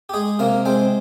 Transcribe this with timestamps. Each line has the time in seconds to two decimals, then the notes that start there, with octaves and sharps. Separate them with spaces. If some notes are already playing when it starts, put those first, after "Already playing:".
0.09 G4
0.14 G#3 G#4
0.39 C3 A#3 A#4
0.65 G#3 C4 C5